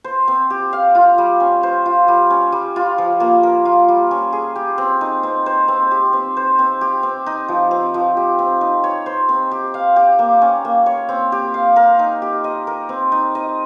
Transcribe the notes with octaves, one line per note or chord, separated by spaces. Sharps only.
C5
C4
G4
F5
F4
G3
C#4
C5
F4
G3
C#4
G3
F4
F3
A#3
A#4
F4
G3
C#4
G#4
G4
C4
D#4
C4
C5
C4
G4
C4
C5
C4
G4
C4
D#4
F3
C4
F3
G4
C4
D#4
C#5
C5
C4
G4
F5
G4
A#3
C#4
A#3
C#5
C4
G4
F5
A#4
D#4
G4
D#5
A#4
C4
D#4
D#5